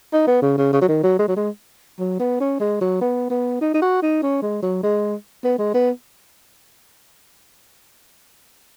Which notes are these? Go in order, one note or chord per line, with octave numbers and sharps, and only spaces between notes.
D#4
B3
C#3
C#3
C#3
F#3
D#3
F#3
G#3
F#3
G#3
F#3
B3
C#4
G#3
F#3
B3
B3
D#4
D#4
F#4
D#4
C#4
G#3
F#3
G#3
B3
G#3
B3